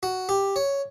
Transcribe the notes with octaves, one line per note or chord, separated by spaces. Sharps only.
F#4
G4
C#5